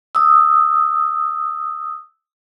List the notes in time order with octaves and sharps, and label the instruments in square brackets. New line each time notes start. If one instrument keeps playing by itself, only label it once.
[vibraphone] D#6 E6